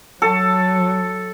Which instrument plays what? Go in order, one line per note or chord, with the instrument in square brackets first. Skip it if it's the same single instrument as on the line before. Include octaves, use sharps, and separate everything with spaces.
[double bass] F#3 [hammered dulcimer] A4